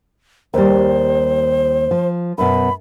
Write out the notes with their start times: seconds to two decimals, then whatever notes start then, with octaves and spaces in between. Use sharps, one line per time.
0.54 D#2 G3 C5
1.91 F3
2.38 F#2 B2 B5